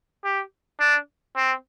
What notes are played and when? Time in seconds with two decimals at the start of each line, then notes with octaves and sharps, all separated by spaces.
0.24 G4
0.80 D4
1.37 C4